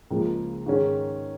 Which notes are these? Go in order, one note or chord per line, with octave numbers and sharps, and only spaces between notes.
C#2 C#3 F3 A#3
G#2 D#3 G#3 C#4